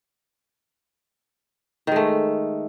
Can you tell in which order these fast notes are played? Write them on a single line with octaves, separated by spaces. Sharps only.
D#3 G#3 A3